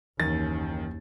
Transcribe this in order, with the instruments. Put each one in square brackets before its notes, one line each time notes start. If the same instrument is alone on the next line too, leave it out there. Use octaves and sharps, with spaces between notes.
[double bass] F#1 D#2 [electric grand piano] D#3 C#4 [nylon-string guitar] E3 G#5 [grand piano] A6